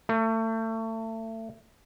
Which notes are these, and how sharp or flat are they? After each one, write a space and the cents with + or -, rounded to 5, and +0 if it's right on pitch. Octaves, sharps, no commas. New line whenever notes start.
A3 +30